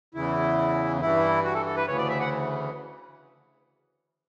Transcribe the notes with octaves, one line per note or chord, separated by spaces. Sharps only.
E2 C#3 E3 E4
G2 E3 E4
F#4
A4
A4
B4
D2 C#3 E3 C#5
D5
E5
F#5